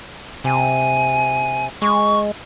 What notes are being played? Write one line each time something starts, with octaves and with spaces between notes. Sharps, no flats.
C3 G#5
G#3 C#6